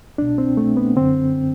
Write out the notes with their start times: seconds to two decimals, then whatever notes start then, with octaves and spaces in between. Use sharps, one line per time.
0.18 C2 B2 D4
0.38 C4
0.57 A3
0.77 B3
0.96 F#2 D3 C4